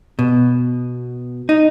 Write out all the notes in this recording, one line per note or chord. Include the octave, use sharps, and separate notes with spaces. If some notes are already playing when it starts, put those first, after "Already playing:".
B2
D#4